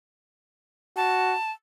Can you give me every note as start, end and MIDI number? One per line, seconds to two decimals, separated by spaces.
0.97 1.36 66
0.97 1.51 81